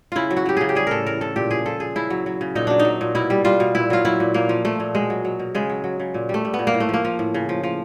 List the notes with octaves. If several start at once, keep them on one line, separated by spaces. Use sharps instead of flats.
C#3 E4 F4
F#3
F#4
F#3 G4
C#3 G#4
G4
G3 G#4
A2 A4 A#4
E3 A#4
A2 A4
A#2 G4
F3 G#4
F3 A4
A#2 G#4
C#3 E4
F#3
F#3
C#3
A#2 D#4
F#3 D4
D#4
F#3
A#2
B2 E4
G3
G3 F4
B2
A#2 E4
F#3 F4
F#3 E4
A#2
A#2 A#3
F3
F3 A3
A#2
B2 G#3
F#3
F#3
B2
C#3 G#3
F#3
F#3
C#3
A#2
G3 A3
G3
B3
A#2
A#3
A2
A3
F3 A#3
F3
A2
C#3
F3
F3